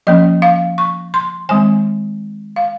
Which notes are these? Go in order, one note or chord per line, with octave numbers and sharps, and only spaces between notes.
F3 A#3 C#4 D#5
F5
C#6
C6
D#3 G#3 C4 G#5
F5